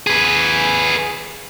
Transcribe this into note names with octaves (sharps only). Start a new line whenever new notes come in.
G#4 B4